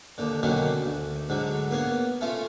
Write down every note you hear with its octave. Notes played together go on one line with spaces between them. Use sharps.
D#2 D3
B2 D3 D#3 F#3 A#3 C#4
D2
G#2 D3 F#3
A#3 B3 C#5
A3 C#4 F4